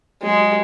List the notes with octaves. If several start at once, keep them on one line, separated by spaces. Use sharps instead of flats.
F#3 G#3
G4